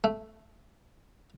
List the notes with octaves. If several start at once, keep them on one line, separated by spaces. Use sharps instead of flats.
A3